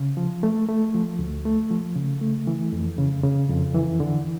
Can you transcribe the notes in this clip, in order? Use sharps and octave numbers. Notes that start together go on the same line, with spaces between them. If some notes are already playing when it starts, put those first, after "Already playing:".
Already playing: C#3
F3
A3
A3
F3
D2
A3
F3
C#3
A3
E3
F2
C#3
C#3
F2
E3
D3